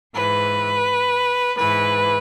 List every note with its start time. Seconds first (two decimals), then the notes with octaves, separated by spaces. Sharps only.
0.14 G#2 E3 B4
1.57 G#2 E3 B4